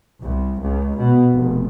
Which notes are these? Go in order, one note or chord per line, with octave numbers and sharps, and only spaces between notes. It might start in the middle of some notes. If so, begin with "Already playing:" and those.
C2
C#2
B2
F1